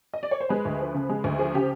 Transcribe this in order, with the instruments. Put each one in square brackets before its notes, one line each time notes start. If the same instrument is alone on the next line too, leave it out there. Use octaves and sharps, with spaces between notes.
[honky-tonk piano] D#5
D5
C#5
C5
G#3 B4
D2
F3
C#3
G#3
D2
F3 G#4
C#3 G4